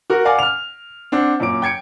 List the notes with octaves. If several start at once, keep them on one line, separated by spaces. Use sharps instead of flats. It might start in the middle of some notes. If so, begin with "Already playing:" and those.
F#4 A#4
D5 F5 F#5 G#5 D6
F6 F7
C4 D4 F#5
F#2 A#2 D6 D7
G5 G#6 C#7 D7